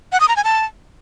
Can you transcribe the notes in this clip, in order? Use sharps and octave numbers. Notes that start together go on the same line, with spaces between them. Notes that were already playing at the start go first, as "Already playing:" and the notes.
F#5
D#6
A#5
G#5
A5